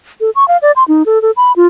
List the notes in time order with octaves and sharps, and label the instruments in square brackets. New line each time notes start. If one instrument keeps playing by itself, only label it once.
[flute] A4
C#6
F5
D5
C6
D#4
A4
A4
B5
F4